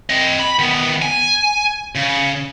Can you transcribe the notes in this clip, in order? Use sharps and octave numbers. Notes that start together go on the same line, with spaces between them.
C4 D#5
B5
D#3 B3
G#5
C#3